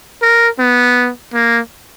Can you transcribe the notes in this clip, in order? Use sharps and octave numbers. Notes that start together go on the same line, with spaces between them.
A#4
B3
A#3